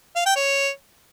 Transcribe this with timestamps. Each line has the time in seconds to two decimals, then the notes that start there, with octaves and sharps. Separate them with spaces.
0.16 F5
0.26 G5
0.36 C#5